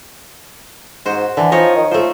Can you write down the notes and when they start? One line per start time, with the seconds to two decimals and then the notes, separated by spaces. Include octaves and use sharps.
1.05 G#2 F#4 C5
1.37 D3 E3
1.52 F3 D#4 C#5 D#5
1.76 D#3
1.91 F3 A3 C5